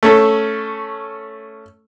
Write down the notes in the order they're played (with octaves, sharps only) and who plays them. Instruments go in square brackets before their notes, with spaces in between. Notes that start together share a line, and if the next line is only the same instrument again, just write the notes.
[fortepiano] A3 C#4 A4